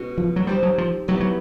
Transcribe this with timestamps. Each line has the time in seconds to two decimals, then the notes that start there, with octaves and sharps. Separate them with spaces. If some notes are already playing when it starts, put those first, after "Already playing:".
Already playing: B2 G#3 C#4 F#4
0.18 F3
0.36 F#3
0.47 G3 C4 D#4 G4 C5
0.63 F#3
0.78 F3
1.08 F#3 B3 E4 G4
1.20 F#3